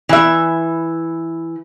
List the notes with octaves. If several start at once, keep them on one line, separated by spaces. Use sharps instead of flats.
E3 E5